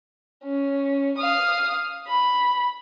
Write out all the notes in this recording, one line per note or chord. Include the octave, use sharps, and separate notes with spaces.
C#4
F5 D#6
B5